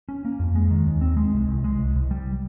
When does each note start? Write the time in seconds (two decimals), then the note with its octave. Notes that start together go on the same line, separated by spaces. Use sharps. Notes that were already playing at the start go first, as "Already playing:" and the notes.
0.09 C#4
0.25 A#3
0.40 F2
0.55 G#3
0.71 D#3
0.86 D#2
1.01 C4
1.17 G#3
1.33 C2
1.48 C2
1.64 G#3
1.79 C2
1.95 C2
2.11 G3